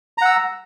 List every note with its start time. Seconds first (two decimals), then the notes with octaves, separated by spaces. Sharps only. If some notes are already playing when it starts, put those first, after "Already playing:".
0.18 A#5
0.22 F#5
0.25 E6